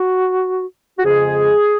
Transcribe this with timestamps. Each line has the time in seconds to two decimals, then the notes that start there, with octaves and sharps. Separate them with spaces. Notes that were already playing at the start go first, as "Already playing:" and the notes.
Already playing: F#4
0.98 F#4
1.04 F2 C#3 G#3 G#4